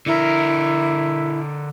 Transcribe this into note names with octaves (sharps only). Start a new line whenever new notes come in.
D3 E4 A#4